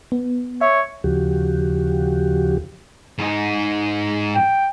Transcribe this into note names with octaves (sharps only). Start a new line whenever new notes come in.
B3
C#5 E5
D#2 C#3 F3 F#4 G4
G#2 D#4
G5